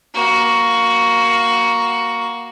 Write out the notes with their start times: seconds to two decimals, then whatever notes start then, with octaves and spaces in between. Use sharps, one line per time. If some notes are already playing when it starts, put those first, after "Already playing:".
0.14 A#3 F#4